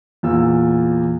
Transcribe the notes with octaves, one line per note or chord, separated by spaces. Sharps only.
E2 A#2 E6